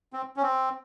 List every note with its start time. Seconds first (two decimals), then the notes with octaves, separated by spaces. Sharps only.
0.13 C4
0.37 C#4
0.43 C4